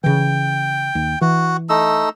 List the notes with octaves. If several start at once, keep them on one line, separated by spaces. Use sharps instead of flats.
C#3 E3 G5
D#2
E3 F#4
A3 D#4 E6